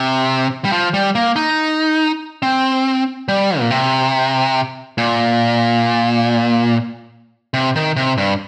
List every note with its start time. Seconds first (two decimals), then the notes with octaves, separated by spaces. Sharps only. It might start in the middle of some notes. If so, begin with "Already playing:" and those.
Already playing: C3
0.65 G3
0.72 F3
0.94 G3
1.15 A#3
1.36 D#4
2.43 C4
3.28 G3
3.59 A#2
3.71 C3
4.98 A#2
7.54 C3
7.76 D#3
7.97 C3
8.18 G2